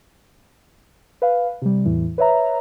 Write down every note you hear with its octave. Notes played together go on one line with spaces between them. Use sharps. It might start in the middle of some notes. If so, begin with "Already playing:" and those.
B4 F5
C3 G3
E2 A2 E3
B4 C#5 E5 A#5